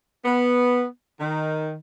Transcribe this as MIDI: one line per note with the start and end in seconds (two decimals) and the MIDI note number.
0.25 0.84 59
1.20 1.74 51